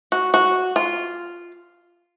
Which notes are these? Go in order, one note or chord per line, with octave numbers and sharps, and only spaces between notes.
F#4
F#4
F4